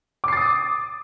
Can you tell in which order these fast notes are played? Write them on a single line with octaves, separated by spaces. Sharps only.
D6 C7 A6 D#6